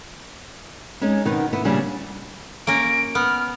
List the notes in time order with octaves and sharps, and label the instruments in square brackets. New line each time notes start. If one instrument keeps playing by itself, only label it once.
[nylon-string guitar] G#3 C#4 D#4
B2 D#3 B3 D#4 B4
B3 E4
A#2 C#3 G3 C#4 D4
[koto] A#3 C#4 A#4 [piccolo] D7
[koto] B3 [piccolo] F6